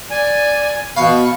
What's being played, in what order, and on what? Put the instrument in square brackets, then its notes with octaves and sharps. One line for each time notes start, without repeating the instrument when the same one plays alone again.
[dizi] D5 [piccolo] G#5
[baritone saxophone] B2 [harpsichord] F5 [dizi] B5 [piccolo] C#6